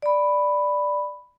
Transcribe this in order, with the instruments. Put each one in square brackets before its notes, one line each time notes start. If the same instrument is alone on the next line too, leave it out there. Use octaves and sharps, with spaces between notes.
[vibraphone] D5 B5